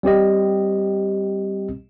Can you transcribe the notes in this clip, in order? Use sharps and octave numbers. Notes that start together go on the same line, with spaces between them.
G3 C4 G4 D#5